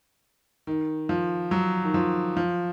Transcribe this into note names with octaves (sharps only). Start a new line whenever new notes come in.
D#3
F3
F#3
D#3
F3
F3